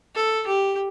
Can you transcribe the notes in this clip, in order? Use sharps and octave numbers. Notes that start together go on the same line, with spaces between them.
A4
G4